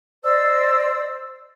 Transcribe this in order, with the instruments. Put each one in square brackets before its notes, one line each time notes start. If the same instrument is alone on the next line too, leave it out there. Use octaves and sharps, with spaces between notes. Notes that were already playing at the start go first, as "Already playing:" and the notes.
[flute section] C5 D5 D#5 E6